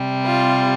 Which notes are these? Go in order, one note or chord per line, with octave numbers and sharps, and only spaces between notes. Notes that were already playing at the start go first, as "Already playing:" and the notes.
Already playing: C3 G3
F4